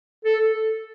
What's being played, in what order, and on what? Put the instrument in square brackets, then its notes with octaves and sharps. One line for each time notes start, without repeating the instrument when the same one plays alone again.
[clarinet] A4